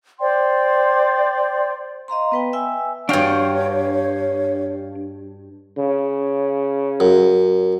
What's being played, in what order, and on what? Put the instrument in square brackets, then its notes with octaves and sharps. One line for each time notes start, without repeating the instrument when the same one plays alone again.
[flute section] C5 D5 G5 C6
[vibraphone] D#5 F5 A#5 C6
B3 B4 G5
E5 G5 G#5 E6
[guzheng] G2 F#4 [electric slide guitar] D4 F5 G5 [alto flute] C#5
[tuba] C#3
[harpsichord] F#2